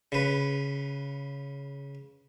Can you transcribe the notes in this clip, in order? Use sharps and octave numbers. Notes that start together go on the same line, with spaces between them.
C#3 B4